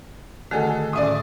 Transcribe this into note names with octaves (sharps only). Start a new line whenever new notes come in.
D3 D#3 A3 F#4 G#4 A4
A2 C#4 D5 E5 D#6